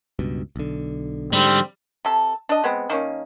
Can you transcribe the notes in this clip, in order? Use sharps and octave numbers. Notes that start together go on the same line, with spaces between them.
C#2 G2 B2
B1 D3
G#2 D3 G3 C4
C3 A4
D4 D#5
G#3 B3 C4
D#3 A#3 C#4